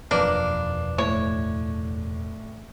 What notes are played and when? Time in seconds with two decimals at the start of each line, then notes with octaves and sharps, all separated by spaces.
0.11 E1 F#2 F3 A#3 D4 B4 F5
0.98 A2 C#5